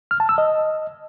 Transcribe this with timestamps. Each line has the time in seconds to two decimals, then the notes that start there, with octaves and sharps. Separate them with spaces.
0.11 F6
0.20 A5
0.29 E6
0.38 D#5